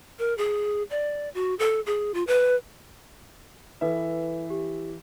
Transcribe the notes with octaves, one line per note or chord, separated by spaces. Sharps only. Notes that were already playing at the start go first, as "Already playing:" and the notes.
A#4
G#4
D5
F#4
A4
G#4
F4
B4
E3 A4 B4 E5
G4